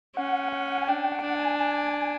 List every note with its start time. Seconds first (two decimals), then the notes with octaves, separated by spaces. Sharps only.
0.16 C#4 F#5
0.52 F#5
0.78 G#5
0.87 D4 G5
1.12 F#5
1.19 G5
1.24 D4 F#5
1.36 G#5
1.59 G#5